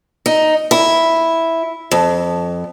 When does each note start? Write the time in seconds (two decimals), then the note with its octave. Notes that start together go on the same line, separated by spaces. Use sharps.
0.26 D#4
0.71 E4
1.91 F2